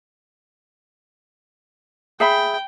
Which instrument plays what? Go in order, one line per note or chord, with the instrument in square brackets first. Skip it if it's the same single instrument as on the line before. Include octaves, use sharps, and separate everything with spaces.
[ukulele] G#4 E5 B5 [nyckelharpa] G5